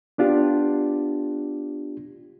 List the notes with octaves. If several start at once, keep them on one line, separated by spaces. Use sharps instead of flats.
B3 D4 F4 G4